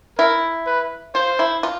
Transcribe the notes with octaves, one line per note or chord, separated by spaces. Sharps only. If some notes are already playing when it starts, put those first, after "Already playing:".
E4 A#4
B4
F4 C5
E4
F4